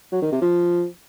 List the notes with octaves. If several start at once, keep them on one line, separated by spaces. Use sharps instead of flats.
F#3
D#3
C3
F3